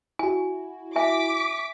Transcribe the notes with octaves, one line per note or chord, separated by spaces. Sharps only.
E4 F#4 G#5
E5 G#5 D6 B6